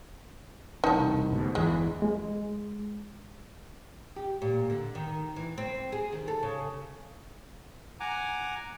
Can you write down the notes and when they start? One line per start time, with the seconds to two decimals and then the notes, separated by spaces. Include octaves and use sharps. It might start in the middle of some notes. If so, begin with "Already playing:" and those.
0.84 E1 C2 D#4 A5
1.32 D2 G#2 B2
1.55 G1 E2 E3 G#3
2.02 G#3
4.16 G4
4.42 A#2
4.70 D3
4.95 D#3
5.36 E3
5.58 C4
5.92 G#4
6.12 D#3
6.28 A4
6.43 C#3
8.00 F#5 G#5 A#5 D6